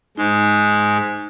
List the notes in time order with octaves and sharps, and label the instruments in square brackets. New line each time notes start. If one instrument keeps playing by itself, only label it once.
[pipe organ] G#2 G#3 [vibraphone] D#4